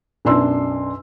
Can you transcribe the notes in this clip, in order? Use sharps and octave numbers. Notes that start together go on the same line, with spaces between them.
B1 F#2 D4 C6 E6